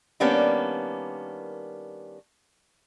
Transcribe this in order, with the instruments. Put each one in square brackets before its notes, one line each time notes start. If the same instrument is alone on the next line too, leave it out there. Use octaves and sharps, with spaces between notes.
[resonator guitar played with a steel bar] D#3 G3 A#3 B3 C#4 D4